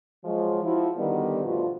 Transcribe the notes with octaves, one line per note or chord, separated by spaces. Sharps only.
F3 F#3 G#3
F3 E4 F#4
D3 D#3 G3 B3
G2 B2 F3 A3 F4 F#4